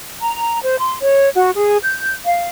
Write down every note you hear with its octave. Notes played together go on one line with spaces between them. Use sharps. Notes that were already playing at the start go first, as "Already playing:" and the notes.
A#5
C5
C6
C#5
F#4
G#4
G6
F5